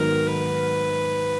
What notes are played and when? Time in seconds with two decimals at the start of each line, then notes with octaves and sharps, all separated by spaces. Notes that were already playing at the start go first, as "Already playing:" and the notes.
Already playing: G#2 D#3 F#3 B3 D#4 A#4
0.27 B4